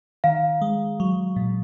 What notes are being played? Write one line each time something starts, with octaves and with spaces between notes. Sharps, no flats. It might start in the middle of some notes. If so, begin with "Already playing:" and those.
D#3 F5
G#3
F#3
A#2